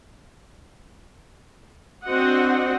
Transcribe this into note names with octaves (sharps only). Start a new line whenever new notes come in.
C4 D4 F#4 D#5 F#5